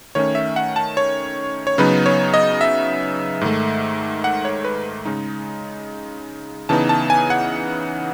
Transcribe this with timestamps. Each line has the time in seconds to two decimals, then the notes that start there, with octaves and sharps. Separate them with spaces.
0.15 D#3 A3 C#4 C#5
0.35 E5
0.56 F#5
0.76 A5
0.97 C#5
1.67 C#5
1.78 C#3 F#3 B3 D#4 B4
2.06 C#5
2.34 D#5
2.61 E5
3.41 G#2 D#3 A3
4.24 F#5
4.45 C#5
4.64 B4
5.05 C#3 G#3 D#4
6.69 C#3 E3 B3 D#4 A5
6.89 A5
7.10 G#5
7.30 F#5